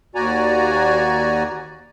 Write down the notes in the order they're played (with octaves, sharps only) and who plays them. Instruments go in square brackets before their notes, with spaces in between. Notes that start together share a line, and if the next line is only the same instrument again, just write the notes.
[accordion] D#2 F#4 D5 G#5 A#5